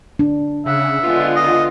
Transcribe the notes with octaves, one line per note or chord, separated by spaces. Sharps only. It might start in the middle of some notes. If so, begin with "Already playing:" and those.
D4
C#3 E5 F#5
D3 G#3 B3 F4
D#5